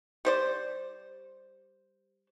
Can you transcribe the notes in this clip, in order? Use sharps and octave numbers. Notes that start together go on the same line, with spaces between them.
G3 C5 D5